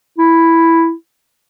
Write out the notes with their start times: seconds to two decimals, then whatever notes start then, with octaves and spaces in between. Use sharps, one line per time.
0.18 E4